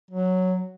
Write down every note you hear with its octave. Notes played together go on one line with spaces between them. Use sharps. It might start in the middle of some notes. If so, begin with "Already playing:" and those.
F#3